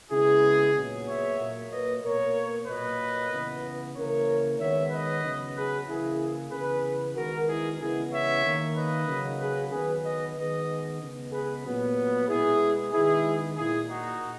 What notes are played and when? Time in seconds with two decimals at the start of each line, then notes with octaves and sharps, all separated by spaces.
0.11 C#3 G#3 B3 E4 G#4
0.75 A#2 F#3 B3
1.07 C#5 E5
1.39 A#2 F#3 A#3
1.71 B4 D#5
2.03 B2 A#3 A#4 C#5
2.67 A#2 F#3 A#3 B4 D#5
3.31 C#3 E3 B3
3.95 C#3 E3 A#3 A#4 C#5
4.59 D#3 G#3 B3 C#5 E5
4.91 B4 D#5
5.23 C#3 F#3 B3
5.55 G#4 B4
5.87 C#3 E3 A#3 E4 G#4
6.51 C#3 E3 B3 G#4 B4
7.16 D#3 G#3 B3 F#4 A#4
7.48 E4 G#4
7.79 C#3 E3 G#3 B3 E4 G#4
8.11 C#5 E5
8.44 D#3 A#3
8.76 B4 D#5
9.07 C#3 F#3 A#3
9.40 G#4 B4
9.72 D#3 F#3 B3 G#4 B4
10.04 B4 D#5
10.36 D#3 G#3 B3 B4 D#5
11.01 C#3 G#3 B3
11.32 G#4 B4
11.64 A#2 F#3 B3
12.28 B2 G#3 B3 E4 G#4
12.92 D#3 G#3 B3 E4 G#4
13.57 A#2 A#3 E4 G#4
13.88 D#4 F#4